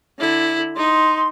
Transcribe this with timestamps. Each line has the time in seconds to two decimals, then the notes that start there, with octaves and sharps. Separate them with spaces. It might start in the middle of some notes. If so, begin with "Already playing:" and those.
0.19 D3 E4
0.77 D#4 C6